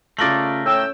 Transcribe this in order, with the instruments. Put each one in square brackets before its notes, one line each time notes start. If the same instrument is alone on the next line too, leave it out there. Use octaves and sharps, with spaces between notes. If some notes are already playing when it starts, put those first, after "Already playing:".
[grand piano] C#3 F4 F#7 [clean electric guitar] A3 A#4 D5
[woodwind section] A2 G5 E6 [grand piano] C#4